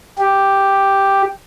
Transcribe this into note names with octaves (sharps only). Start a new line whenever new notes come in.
G4